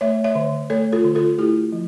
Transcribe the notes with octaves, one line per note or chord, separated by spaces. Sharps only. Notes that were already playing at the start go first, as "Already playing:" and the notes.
A3 C#5 E5
C#5 E5
D3
A3 A4 C#5
F4 A4
D3
F4 A4
A3 E4 G4
F3